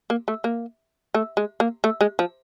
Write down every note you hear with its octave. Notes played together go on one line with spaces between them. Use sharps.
A#3
A3
A#3
A3
G#3
A#3
A3
G#3
F3